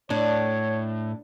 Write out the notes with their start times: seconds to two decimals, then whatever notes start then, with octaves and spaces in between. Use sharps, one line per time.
0.10 A2 D4 C#5